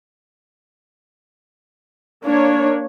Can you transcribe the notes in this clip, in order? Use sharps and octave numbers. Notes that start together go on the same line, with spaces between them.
A#3 D4 C#5